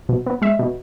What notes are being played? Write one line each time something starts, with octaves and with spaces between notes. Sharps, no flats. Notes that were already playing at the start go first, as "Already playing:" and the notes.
B2
B3
G#3 E5
B2